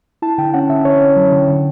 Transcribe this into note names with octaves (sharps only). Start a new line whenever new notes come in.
E4 A5
D3 G5
C#4 F#5
D3 E5
D3 C#5
C#4
F#3
D3
D3